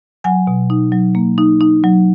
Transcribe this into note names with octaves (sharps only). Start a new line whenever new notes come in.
F#3 F#5 G#5
B2
D#4
F#3
A#3
D#4
D#4
F#3